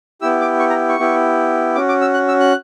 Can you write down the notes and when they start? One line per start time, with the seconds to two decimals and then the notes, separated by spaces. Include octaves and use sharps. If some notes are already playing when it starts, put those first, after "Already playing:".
0.21 B3 E4 G4 E6
0.41 D6
0.60 C#6
0.70 A#5
0.89 C#6
0.99 B3 E4 G4
1.75 C#4 F#4 D6
1.89 D6
2.01 E6
2.14 F#6
2.28 E6
2.40 F#6